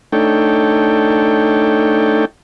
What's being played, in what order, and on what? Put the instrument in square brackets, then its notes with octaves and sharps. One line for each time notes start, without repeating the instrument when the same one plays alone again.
[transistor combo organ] A3 D4 D#4 A4 C#5 G5